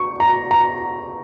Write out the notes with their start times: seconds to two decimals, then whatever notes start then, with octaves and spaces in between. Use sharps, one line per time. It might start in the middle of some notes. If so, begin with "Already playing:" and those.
Already playing: C#6
0.20 A#5
0.51 A#5